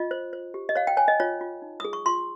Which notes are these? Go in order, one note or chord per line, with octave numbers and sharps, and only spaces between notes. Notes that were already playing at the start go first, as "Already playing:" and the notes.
Already playing: F4 D#5
C5
C5
G4
D#5
C#5 F5
G5
C#5 G#5
D#5
F4 C#5
F4
D#4
G#4 D#6
C#6
F4 C6